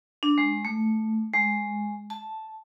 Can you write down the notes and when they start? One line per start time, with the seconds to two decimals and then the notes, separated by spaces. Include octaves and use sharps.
0.23 D4
0.38 G#3
0.65 A3
1.33 G#3
2.10 A5